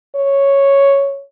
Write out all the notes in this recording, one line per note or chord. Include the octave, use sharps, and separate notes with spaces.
C#5